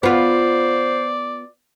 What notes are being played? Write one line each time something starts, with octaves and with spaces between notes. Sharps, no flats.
B3 F4 C5 D5